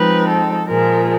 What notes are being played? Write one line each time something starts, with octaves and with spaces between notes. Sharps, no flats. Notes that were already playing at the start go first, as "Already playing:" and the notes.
Already playing: F3 G#3 C4 D#4 B4
A4
A#2 F3 G#3 A#4